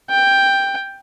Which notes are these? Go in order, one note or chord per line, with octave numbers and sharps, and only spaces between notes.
G5